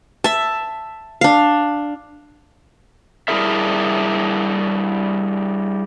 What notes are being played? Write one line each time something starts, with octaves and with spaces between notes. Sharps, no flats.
E5 A5
D4 F5
G3 D4 E4 G#4 A#4 E5